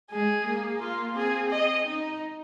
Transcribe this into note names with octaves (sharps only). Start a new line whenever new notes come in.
G#3 G#4
A#3
F4
C4 G#4
D#5
D#4